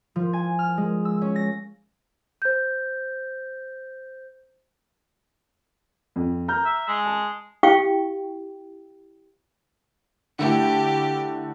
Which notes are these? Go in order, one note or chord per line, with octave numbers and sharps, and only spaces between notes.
F3
G#5
F6
G#3
E6
C#4
A#6
C5 G6
F2
A#5 F6 G6
E5
G#3
A5
E4 G4 F5 G5 C#6
D3 A3 E4 G4